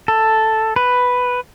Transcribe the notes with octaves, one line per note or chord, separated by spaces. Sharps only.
A4
B4